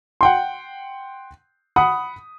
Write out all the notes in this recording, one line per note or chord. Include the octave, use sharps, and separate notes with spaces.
F#5 G5 C6
F#5 B5 D#6